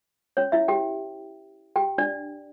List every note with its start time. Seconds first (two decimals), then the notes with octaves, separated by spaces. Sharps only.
0.37 C#4 C#5
0.52 E4 E5
0.68 G4 G5
1.76 G4 G5
1.98 D4 D5